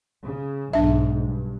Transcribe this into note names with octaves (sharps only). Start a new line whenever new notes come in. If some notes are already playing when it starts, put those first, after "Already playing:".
C#3
B1 G#2 D4 E5
G2